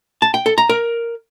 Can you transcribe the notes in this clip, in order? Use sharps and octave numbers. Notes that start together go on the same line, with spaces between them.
A5
G5
A4
A#5
A#4